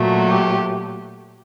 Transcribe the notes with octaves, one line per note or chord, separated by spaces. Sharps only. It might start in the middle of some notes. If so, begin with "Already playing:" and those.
Already playing: A#2 F#3 A3
G4